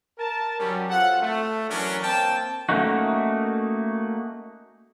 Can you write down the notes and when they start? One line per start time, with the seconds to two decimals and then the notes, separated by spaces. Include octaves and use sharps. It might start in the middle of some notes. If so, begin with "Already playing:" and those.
0.19 A#4 A5
0.60 F#3 G3 C#4
0.90 C4 F4 A4 F#5
1.22 A3
1.69 E3 F#3 C#4 D4 A#4 C#5
2.03 A#3 C4 G5 A5
2.69 A3 A#3 C#4 D#4 F#4